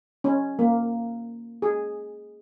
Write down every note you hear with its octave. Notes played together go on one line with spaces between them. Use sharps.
C#4
A#3
G#4